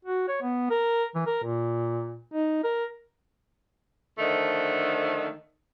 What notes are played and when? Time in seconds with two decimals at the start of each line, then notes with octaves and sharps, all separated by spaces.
0.05 F#4
0.28 C#5
0.42 B3
0.70 A#4
1.15 E3
1.26 A#4
1.44 A#2
2.34 D#4
2.63 A#4
4.17 D3 D#3 F3 A3